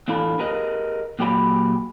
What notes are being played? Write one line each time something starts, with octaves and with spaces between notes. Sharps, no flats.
E2 A2 D4 F4 A4 B5
G4 G#4 A#4 B4 D#5
A#2 F#3 G4 G#4 C5 B5